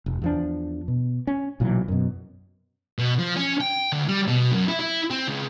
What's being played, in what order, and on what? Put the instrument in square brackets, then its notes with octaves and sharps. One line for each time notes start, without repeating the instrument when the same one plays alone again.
[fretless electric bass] F1
E2 F3 D4
B2
C#4
B1 A#2 E3 F#3
F#2 B2
[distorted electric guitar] B2
F3
C#4
G5
D2
G3
B2
F#2
E4
E4
C4
C#2